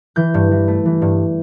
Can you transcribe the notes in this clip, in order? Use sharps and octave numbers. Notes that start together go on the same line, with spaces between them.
E3 G6
G2
E3
A3
E3
G2